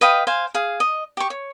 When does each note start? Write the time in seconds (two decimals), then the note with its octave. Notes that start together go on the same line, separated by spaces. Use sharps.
0.01 B4 D#5 F5 G5
0.27 C5 F5 G#5
0.54 G#4 F5
0.80 D#5
1.17 G4 C#6
1.30 C#5